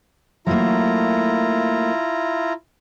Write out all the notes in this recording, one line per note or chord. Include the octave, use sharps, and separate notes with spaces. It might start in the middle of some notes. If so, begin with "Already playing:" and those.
F#3 A3 A#3 E4 F4 A#5